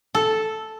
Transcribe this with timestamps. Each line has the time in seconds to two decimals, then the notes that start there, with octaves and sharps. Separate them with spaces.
0.15 A4